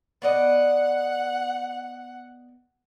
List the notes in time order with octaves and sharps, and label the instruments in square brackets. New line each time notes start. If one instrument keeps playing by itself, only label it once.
[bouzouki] B3 D5 D#5 [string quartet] F#5